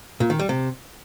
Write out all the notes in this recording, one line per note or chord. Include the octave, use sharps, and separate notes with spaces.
A#2
D#3
G3
C3